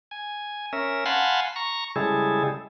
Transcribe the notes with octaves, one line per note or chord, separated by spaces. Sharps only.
G#5
C#4 A#4 E5
F5 F#5 G#5 A5 B5 C6
A#5 C#6
C#3 G3 G#3 E4 G#4 A4